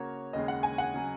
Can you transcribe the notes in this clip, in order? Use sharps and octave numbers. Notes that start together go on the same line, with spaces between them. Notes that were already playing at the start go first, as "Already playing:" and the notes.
Already playing: C#3 A#3 F#4 A#4 C#5
D#2 C#3 G#3 D#5
F#5
G#5
F#5
C#3 F#3